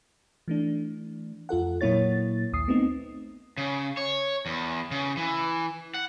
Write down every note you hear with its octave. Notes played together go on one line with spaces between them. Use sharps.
E3 A3 D4
F2 F4 A4 F#5
A#2 F#3 A#3 E4 C#5 A6
A#1 D#2 D#6 C7
A3 B3 C4 D#4
C#3
C#5
E2
C#3
E3
F#5